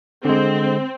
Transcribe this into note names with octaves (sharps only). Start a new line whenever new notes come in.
D3 G#3 C4